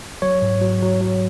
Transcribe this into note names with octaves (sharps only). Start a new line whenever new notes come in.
F#3 C#5
G#2
F#3
F#3
F#3